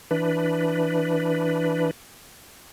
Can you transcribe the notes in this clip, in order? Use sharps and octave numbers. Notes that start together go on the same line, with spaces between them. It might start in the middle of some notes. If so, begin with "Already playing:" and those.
E3 D4 B4